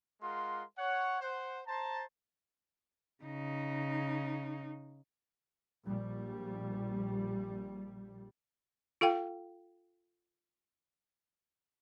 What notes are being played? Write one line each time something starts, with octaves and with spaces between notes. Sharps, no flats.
G#3 F4 A#4 F5 F#5 C6
C#5 F#5
C5 F#5
C5 A5 A#5
C#3 D#4
A#1 G3
F4 A4 F5 G5